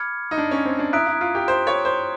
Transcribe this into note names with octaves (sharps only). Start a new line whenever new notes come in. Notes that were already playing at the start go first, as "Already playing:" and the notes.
Already playing: B5 D6 F6 G#6 C#7
D#4
D4
C#4
C4
D4
E4 A#5 D#6 F#6 B6 D7
E4
F4
G4
C5
C#5
C5